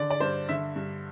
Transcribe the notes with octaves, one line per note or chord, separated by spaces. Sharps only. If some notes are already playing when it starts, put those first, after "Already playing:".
Already playing: D3 D5
D5
G2 C5
D3 E5
G2